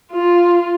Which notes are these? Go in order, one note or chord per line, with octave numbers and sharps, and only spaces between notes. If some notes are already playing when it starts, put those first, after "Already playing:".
F4